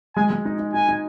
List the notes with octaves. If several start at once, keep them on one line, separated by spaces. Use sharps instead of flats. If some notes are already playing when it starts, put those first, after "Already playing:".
G#3 G#5
G#3
D#4
D#4
D#4 G#5
D#4